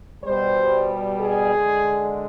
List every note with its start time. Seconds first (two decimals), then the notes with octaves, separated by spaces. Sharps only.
0.24 B2 G3 C5
1.21 G#4
1.53 D3 G#3